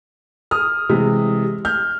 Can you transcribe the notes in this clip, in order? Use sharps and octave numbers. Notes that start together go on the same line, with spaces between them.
D#6 F6
C3 E3 G#3
F6 G6